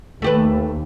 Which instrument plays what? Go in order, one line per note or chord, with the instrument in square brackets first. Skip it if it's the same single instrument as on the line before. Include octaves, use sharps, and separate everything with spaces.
[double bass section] D#2 [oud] A3 G4 B4